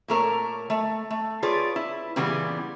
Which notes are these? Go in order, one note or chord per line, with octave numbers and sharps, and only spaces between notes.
A#2 A3 A#4 C#5
A3
A3
F4 G#4 B4 C#5 D5
E4
A#2 C#3 E3 G3 B3 G#4